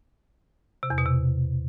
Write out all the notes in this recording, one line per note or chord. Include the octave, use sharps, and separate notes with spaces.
C3
E2
B2
C3